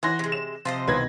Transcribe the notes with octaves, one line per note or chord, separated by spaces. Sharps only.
E3 F#4 C6 A#6
C3 G#3
E7
C3 F3 C5 D#5
C2 B2 D#3 B4 G#6 A#6